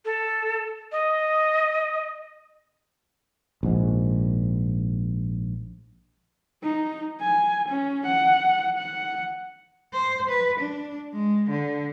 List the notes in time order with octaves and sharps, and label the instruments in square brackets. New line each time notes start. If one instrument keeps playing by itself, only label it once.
[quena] A4
D#5
[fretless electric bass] A#1 G#2
[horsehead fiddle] D#4
G#5
C#4
F#5
F#5
[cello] C5
B4
D4
G#3
D3